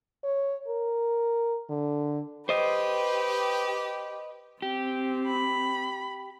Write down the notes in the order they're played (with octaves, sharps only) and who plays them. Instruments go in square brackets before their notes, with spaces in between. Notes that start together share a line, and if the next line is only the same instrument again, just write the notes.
[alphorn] C#5
A#4
D3
[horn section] G4 [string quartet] B4 [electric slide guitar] C5 D#5
[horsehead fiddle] C4 [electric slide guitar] G4
[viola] B5